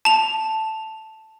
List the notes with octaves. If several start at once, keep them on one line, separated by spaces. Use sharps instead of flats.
A5 F7